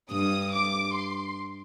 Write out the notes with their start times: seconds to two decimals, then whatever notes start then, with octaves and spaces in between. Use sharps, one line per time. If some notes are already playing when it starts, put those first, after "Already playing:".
0.11 G2 D#6
0.52 D6
0.94 C6